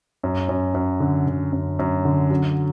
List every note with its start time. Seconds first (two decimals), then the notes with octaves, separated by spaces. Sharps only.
0.23 F#2
0.49 F#2
0.74 F#2
1.00 D3
1.27 D3
1.53 F#2
1.79 F#2
2.05 D3
2.30 F#3